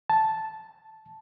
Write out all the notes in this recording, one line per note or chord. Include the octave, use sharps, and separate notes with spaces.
A5